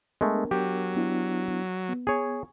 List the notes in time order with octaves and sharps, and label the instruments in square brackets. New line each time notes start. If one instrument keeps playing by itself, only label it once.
[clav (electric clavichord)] G#3 A3 [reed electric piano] B3 D4 A#4
[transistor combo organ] F#3 [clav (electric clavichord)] G4
[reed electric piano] B3 D4 E4
B3
[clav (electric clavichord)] G#4 C#5